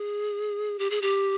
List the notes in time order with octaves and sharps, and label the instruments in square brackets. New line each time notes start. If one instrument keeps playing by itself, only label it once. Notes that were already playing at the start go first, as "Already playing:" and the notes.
Already playing: [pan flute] G#4
G4
G#4
G4